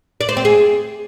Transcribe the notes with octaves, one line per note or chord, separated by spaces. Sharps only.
D5
C5
C4
G#4